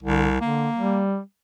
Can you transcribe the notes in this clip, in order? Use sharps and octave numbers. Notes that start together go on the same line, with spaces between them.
C2 D3
D3 A#3
G3